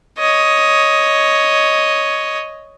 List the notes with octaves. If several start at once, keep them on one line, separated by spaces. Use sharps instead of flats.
C#5 D#5